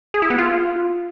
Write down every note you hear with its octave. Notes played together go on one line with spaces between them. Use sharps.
G#4
E4
B3
F4